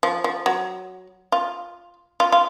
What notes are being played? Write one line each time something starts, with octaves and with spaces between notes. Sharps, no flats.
F3
F3
F#3
F4
F4
F4